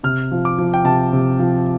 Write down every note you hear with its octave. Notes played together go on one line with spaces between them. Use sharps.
C3 F6
F3
D6
F3
G5
C3 A5
C3
F3